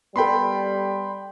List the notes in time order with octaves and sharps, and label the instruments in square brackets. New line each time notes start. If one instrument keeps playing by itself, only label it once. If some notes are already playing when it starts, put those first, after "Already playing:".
[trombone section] G3 [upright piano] B3 A4 [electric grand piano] G5 B5 C6